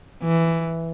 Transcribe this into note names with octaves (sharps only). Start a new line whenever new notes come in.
E3